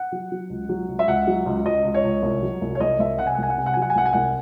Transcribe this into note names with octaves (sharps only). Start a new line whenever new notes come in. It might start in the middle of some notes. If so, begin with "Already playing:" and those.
Already playing: F#5
F#3
F#3
C#2
F#3
C#2
E5
C#2 F#5
F#3
C#2
C#2 D#5
C#2
C#5
C#2
C2
F#3
C2
C#5
C2 D#5
C2 E5
C3 F#5
G#5
F#5
C2 G#5
F#5
C3 G#5
F#5
F#3 G#5
F#5
G#5
C2 F#5
G#5
C2 F#5